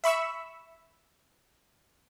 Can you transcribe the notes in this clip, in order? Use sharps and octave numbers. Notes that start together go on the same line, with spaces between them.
E5 B5 C#6 E6